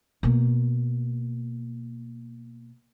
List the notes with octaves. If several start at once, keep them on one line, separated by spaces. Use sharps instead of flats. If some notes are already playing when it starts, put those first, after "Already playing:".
B2 A#3